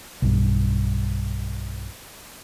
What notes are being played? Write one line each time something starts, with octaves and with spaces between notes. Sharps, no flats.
B1 G2